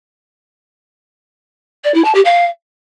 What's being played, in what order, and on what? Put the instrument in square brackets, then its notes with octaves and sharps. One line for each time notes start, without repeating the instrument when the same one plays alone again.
[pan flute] D5
E4
A5
G4
F5